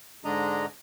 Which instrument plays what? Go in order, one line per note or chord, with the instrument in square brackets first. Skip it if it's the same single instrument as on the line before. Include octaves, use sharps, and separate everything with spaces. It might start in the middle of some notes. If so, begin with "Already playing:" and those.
[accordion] G#2 D3 G#3 D4 D#5 A#5